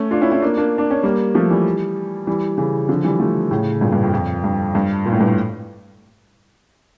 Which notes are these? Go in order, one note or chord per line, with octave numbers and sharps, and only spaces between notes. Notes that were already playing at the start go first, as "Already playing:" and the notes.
Already playing: A3 C#4
D4 F4
C#4 E4
C#4 E4
A#3 D4
A#3 D4
D4
C#4
G3 A#3
F3 A3
E3 G3
E3 G3
C#3 E3
D3 F3
E3 G3
F3 A3
A2 C#3
G2 A#2
G2
F2
F2
G2
G2
A#2
A2
G2
A2